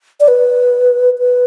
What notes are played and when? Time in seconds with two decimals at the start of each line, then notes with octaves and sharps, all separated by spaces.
0.20 D5
0.28 B4
1.19 B4